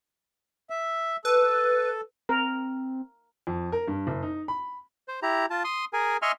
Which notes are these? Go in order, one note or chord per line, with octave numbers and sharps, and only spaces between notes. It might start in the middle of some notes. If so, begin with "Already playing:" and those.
E5
A4 B4
C4 A#4
F2
A#4
G2
F#1
D#4
B5
C5
E4 G4 A#5
F4 A5
C6 D#6
G#4 A#4 G#5
D#5 E5 G#5 C6 C#6 F6